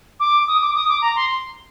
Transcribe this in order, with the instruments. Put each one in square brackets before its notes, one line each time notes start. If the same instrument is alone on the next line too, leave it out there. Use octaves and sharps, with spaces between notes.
[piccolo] D6
D#6
D6
D#6
D6
A#5
C6